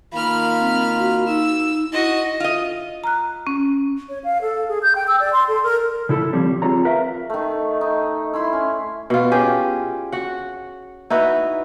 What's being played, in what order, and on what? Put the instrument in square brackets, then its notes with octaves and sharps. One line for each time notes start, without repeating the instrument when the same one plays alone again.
[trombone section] D#3 A#3 F4 [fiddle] B5 F6
[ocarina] C4
F#4
[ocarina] D#4 [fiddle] E6
[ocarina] E4 [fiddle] F#4 D#5
[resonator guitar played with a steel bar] F4 D#5
[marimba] A#5 F6 F#6
C#4
[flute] C#5
F5
A4
G#4
G6
G5
E6
D5
C6
A4
A#4
[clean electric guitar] C#3 E4 A4 A5 B5
D#3 F3 G3 C4 C#5
C4 F4 G#4 C#5 A#5
A#4 B4 E5 F5 A#5
[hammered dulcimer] D#3 A3
D#4
E4 B5 C6
C#4
[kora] B2 F4
C#4 G4 G#4
F#4 F#5
D#4 E4 F#4 B4